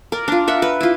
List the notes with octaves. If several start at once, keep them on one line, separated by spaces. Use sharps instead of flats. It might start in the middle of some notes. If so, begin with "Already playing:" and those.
A#4 D5
D4 F4
A#4 E5 F#5
B4
E4 F4